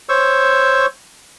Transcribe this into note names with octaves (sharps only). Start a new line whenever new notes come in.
C5 C#5 C#6 E6